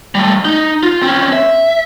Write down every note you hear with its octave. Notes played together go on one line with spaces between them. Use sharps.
G3 A3
D#4
F4
C4 C#4
E5